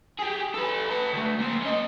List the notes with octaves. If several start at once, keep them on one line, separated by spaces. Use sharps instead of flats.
G4 G#4
A4 B4
B4 A5
D2 A3
A#3 C5
C#4 D#5